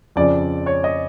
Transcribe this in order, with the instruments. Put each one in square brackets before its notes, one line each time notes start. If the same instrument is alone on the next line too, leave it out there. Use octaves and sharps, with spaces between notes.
[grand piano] F2 C#3 F3 D5
C#5
D#5